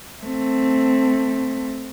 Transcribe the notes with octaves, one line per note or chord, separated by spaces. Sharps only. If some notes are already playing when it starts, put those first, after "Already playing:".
A3 C4